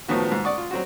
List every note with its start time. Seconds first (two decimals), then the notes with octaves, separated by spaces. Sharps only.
0.08 A2 D#3 F3 B3 F#4
0.31 G#2
0.44 D5 F#5 C#6 D#6
0.58 F4
0.71 F#3 C4 F#4